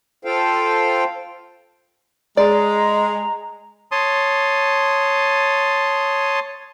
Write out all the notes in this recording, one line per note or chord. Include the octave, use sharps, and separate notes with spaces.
F4 A4 C5 F5 G5
G#3 D5 A#5
C#5 A5 C6 D#6